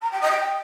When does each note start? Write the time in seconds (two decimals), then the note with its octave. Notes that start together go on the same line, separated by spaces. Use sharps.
0.02 A#5
0.11 G5
0.21 D#5
0.31 G5